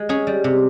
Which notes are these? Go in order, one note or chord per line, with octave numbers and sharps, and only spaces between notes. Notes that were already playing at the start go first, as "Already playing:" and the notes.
Already playing: G#3
C#4 G#4
G3
C3